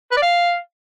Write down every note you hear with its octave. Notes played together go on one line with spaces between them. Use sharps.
B4
D5
F5